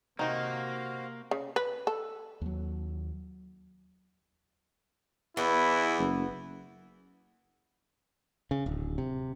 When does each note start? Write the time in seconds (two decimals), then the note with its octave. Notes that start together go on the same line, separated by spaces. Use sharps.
0.19 C3 D#3 A#3 D#4 F#4 C5 F5
1.31 C#3
1.56 B4
1.87 A4
2.41 D#2 F#3
5.37 E2 B3 E4
5.99 F#1
8.51 C#3
8.66 D1
8.98 C3